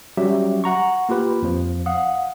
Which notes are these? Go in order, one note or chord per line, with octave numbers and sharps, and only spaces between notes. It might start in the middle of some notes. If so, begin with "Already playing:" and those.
F#3 G3 C#4 F#4 G4 E5
F#5 A#5 C#6
A#3 F4 G4 B4
F2 F3
F5 F#5 D#6